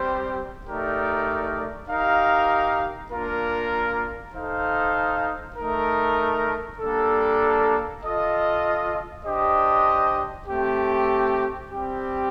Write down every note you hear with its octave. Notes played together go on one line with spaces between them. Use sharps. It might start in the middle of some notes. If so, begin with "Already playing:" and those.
Already playing: G3 C4 G4 C5
A3 D#4 G4 A#4 D5
D#4 G4 A#4 F5
A#3 D4 F4 A#4
D#4 A4 C5 F5
A3 D#4 A#4
G3 A#3 D4 A4
F4 A4 D#5
D4 G4 C5 D#5
A3 C4 G4
G3 C4 G4